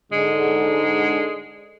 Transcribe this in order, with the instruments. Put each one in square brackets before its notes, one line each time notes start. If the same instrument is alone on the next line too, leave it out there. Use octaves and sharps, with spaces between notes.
[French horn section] G#2 D3 [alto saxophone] G#3